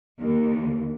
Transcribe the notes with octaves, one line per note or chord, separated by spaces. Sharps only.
D#2